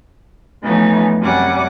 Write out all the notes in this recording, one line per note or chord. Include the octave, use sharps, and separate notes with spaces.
E3 F3 A3 B3 C#4 D#4
F#2 C3 G3 C#4 F#5 D6